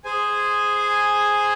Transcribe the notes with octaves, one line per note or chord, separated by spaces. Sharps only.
G#4 C5 G#5